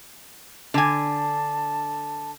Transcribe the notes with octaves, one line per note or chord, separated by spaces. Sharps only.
D3 G#5 A5